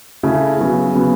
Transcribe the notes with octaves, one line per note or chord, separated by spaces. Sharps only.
C#3 A3 E4
C#3 F#3 B3
C#3 F#3 B3